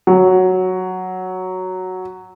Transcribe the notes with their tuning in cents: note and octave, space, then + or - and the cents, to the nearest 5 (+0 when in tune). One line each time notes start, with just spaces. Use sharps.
F#3 +0